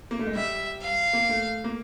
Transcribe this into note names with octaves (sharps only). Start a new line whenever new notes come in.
A#3
A3
G#3
G3 E5
F5
A#3
A3
A#3